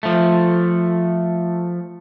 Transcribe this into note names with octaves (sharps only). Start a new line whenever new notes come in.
F3 A3